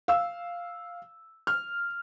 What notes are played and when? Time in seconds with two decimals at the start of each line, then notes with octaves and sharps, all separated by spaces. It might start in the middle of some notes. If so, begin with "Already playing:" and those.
0.08 F5 E6
1.47 F6